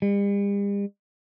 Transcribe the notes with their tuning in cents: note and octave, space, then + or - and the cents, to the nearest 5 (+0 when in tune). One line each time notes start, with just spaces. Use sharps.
G3 +45